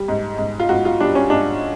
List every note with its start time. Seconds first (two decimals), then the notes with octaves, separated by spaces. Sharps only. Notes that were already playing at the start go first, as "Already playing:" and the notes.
Already playing: G3
0.08 G#2
0.38 G#2
0.60 F4
0.69 G#2 F#4
0.85 F4
1.00 G3 D4
1.15 C#4
1.30 G#2 D4